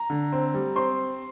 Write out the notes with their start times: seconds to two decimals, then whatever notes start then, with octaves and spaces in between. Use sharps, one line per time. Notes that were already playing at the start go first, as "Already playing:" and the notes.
Already playing: A#5
0.10 D3
0.33 C4
0.54 G3
0.76 C4 C6